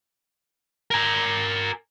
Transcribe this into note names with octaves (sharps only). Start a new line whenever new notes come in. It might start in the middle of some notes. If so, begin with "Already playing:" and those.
A#4 G#5